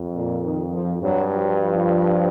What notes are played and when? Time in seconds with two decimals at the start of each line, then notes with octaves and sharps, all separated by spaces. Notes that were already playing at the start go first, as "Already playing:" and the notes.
Already playing: F2
0.14 A#2
0.43 D#3
0.73 F3
1.02 G2 F#3
1.33 F3
1.62 F3